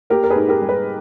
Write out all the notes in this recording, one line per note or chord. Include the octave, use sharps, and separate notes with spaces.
A#3 G4 A#4
A#4
G#4 B4
G#2
G4 A#4
G3
G#4 B4